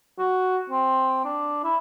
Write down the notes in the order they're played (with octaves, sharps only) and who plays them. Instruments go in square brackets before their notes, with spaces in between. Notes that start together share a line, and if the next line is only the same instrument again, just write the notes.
[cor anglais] F#4
C4
D4
E4